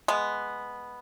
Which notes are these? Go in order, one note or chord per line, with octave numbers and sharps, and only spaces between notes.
G#3 B3